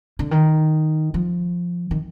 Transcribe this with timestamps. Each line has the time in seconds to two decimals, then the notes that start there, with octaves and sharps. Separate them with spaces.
0.19 D3
0.31 D#3
1.14 F3
1.91 D#3